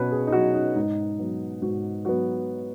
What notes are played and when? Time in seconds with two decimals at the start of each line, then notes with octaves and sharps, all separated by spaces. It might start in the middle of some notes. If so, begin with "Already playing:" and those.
Already playing: B2 F#3 C#4 B4 C#5
0.11 G#4
0.27 D#4
0.32 F#3 C#4 F#4
0.54 D#4
0.76 G#2 D#4
1.19 F#3 B3
1.62 G#2 F#4
2.05 F#3 B3 F#4